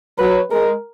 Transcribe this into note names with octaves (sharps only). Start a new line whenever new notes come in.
F#3 B4
G#3 A#4